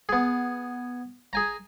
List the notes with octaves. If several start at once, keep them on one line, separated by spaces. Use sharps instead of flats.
B3 G#4
G#4 G#5 A#5